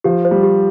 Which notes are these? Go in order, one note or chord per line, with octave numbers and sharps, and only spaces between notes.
F3 G4
C5
G3
G4